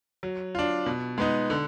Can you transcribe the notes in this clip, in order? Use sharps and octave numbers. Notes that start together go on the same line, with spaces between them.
F#3
D4 F4
B2
G#3 B3 D#4
D3